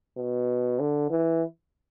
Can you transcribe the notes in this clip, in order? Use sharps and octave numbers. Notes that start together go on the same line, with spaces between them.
B2
D3
E3